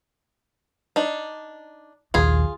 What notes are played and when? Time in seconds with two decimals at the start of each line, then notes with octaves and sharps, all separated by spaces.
0.96 D4 D#4
2.14 A#1 D#2 F4 G#4